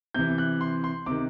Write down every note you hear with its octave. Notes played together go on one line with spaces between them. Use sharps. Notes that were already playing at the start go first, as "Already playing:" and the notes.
C3 E3 G6
F#6
C6
C6
C3 D#3 D6